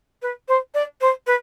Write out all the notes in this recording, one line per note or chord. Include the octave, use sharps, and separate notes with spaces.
B4
C5
D5
C5
B4